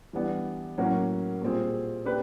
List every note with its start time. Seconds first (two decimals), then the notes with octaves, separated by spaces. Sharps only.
0.13 E3 G3 B3 D4
0.78 A2 F#3 A#3 C#4 F#4
1.42 A#2 G3 C4 F4 G#4
2.05 A#3 D4 G4 B4